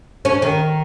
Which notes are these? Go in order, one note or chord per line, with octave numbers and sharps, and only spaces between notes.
C#4
D#3